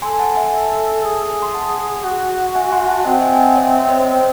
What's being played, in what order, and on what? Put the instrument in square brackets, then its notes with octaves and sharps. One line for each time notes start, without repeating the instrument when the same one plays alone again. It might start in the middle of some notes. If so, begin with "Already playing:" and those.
[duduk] A4 [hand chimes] G#5 C6
[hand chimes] F#5 A5
E5 G#5
[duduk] G#4
[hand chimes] C6
F#5 A5
[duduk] F#4
[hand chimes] E5 G#5
G#5 C6
F#5 A5
[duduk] C4 [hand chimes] D#5 F#5
[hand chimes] E5 G#5
G#5
D#5 F#5
C#5 E5
C5 D#5
[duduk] C4